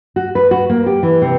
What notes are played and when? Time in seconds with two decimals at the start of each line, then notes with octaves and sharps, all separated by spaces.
0.16 F#4
0.35 B4
0.51 F#4
0.70 A#3
0.86 G4
1.03 E3
1.22 C3